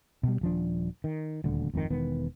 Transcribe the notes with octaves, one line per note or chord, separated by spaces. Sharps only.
B2 G3
D#1 F3 D4
D#3
D#1 D2 D3
G#1 F2 D3 D#3
E1 D#3 B3